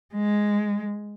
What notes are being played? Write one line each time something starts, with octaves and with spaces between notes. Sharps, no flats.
G#3